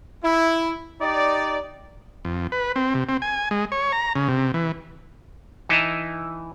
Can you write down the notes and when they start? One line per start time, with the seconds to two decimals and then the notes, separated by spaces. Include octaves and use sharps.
0.24 E4
1.01 D#4 G4 D5
2.25 F2
2.52 B4
2.76 C4
2.94 C3
3.09 C4
3.22 G#5
3.51 G#3
3.72 C#5
3.92 A#5
4.16 C#3
4.28 C3
4.54 E3
5.69 E3 D#4 E4 D#5 A5 A#5